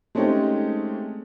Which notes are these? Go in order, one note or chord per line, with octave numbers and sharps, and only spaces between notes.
G#3 A3 C4 C#4 D#4 G4